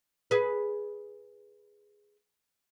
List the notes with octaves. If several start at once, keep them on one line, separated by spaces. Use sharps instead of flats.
G#4 B4